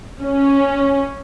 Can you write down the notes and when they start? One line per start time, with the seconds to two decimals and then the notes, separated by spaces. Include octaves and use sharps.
0.22 C#4